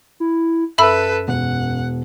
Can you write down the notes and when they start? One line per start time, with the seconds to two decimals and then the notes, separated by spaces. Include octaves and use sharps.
0.20 E4
0.78 F#2 A4 B4 E5 B5 E6
1.28 E1 F#5